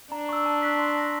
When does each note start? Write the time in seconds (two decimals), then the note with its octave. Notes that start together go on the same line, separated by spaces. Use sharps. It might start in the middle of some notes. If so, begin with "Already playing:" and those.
0.12 D4 A#5
0.29 C#6 E6
0.46 A5
0.62 C#6 F#6 B6
0.79 C6
0.96 F6 A#6